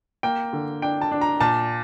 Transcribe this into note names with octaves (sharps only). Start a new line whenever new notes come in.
A#3 G5
D3
D4 G5
A5
D4
A#5
A#2 A5